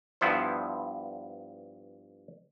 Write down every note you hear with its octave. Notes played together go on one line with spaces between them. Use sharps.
G2 F3 B3 E4 C5